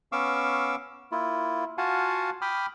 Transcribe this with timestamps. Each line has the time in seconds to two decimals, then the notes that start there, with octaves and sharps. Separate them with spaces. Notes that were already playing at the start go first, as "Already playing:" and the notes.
0.12 B3 C#4 F5 C#6 D6 E6
1.12 A#3 E4 F4
1.78 F4 F#4 F5 F#5 G#5 A5
2.41 G5 B5 D6 D#6 F6